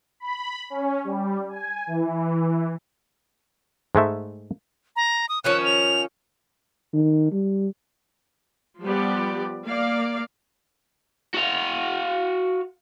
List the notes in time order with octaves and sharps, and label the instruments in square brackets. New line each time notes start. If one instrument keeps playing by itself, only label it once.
[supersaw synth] B5
C#4
G3
G#5
E3
[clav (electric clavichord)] G#2 G#3 A3 E5
[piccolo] A#5
D#6
[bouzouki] D#3 F3 C#4 [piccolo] F#6
[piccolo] F7
[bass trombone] D#3
G3
[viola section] F3 G3 B3 G4 D5
A#3 D5 F5
[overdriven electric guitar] F#4 F5